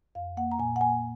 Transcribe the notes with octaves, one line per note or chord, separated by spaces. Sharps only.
F2 F5
A#3 F#5
A#5
A#2 G#5
F#5
A#3 G#5